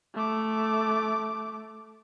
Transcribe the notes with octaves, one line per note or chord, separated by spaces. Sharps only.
A3 D6